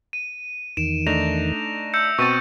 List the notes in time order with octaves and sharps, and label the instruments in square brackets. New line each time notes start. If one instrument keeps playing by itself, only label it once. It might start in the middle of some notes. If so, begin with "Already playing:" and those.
[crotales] D#7
[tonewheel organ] E2 D#3 [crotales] D7 E7
[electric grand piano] A3 D4 D#4 [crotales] A#6 F7
[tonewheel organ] E5 [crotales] E6 G6 C#7
[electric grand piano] B2 C4 A6 [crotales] C#6 D#7